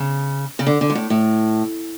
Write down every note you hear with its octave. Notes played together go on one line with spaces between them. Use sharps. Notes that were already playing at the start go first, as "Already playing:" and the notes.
Already playing: C#3
C#3
D3
D3
G#2
A2
A2